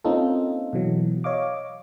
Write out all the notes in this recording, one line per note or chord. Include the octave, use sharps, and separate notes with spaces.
A#3 C4 C#4 D#4 F4 A4
B2 E3 F#3
C#5 D#5 F5 D6